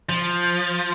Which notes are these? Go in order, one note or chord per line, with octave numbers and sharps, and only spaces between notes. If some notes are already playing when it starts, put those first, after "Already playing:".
F3